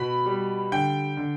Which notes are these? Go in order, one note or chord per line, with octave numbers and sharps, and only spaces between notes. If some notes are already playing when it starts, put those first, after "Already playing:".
Already playing: B2 B5
G3
D3 G5
D3